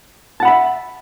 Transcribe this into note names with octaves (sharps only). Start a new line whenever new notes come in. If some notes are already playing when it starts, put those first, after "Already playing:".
E5 F#5 A5 B5